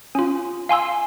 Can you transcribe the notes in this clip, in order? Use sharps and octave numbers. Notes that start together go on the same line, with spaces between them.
C#4 F4
F5 G#5 C6 E6